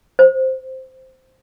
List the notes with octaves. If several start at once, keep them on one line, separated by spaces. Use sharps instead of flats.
C5